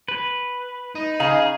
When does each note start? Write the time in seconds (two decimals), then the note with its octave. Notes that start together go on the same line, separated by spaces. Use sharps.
0.08 B4
0.95 D#4
1.20 C#3 G#4 F5 A#5